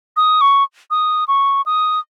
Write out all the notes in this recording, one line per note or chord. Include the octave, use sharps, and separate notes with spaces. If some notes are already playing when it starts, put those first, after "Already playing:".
D#6
C#6
D#6
C#6
D#6